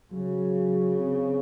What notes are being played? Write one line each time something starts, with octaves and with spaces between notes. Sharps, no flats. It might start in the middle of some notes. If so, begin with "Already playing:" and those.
C#3 F#3
C4